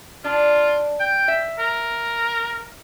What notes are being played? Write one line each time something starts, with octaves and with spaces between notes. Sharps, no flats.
D4 F4
G5
E5
A#4